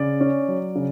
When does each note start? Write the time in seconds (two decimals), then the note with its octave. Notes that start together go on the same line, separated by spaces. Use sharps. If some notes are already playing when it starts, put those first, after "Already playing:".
Already playing: C#3 D5
0.20 C#4
0.48 F#3
0.75 C#3